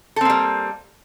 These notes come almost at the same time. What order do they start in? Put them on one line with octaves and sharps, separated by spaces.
A4 C4 A#3 G3